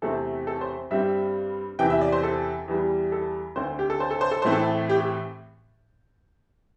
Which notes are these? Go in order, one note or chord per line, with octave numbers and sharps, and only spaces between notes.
E2 C3 A3 C4 A4
A4
C5
G2 G3 C4 E5
E2 C3 E3 G5
E5
D5
C5
A4
E2 E3 G3
A4
D2 D3 C4 C5
G4
A4
C5
A4
C5
A4
A2 E3 A3 C4 C5
A4
G4
G4